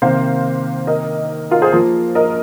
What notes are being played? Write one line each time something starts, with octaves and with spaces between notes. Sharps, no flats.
C3 D#3 A#3 C5 F5
A#4 D#5
F4 A#4
G#4 C5
F3 A#3 F4
A#4 D#5